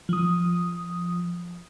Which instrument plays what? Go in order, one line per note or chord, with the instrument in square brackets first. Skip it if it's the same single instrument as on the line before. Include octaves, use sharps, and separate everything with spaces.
[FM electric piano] F3 D#6